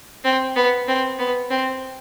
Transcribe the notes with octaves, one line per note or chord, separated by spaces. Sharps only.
C4
B3
C4
B3
C4